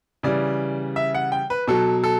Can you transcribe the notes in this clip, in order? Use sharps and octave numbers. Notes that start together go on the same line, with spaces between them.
C#3 E3 G3 D5
E5
F#5
G5
B4
B2 F#3 A4
A4